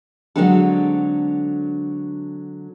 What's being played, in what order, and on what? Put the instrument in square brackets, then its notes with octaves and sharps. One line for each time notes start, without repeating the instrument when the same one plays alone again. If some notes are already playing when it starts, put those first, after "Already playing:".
[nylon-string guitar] D3 F#3 G#3 C4 D4 A4